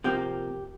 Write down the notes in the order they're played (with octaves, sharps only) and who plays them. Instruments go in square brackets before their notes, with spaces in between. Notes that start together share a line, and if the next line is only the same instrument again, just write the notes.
[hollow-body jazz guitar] C3 F3 A#3 G4